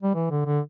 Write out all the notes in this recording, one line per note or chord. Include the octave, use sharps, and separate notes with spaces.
G3
E3
D3
D3